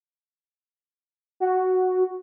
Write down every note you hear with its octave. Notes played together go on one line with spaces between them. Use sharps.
F#4